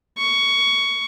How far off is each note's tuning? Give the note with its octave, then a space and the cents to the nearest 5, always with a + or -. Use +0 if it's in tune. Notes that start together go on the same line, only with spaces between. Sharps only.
C#6 +15